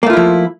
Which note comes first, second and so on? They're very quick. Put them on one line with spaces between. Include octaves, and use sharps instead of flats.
A#3 A3 F4 E4 F3